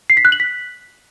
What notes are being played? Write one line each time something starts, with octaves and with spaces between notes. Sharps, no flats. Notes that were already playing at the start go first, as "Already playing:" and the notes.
C7
B6
F#6
F#7
B6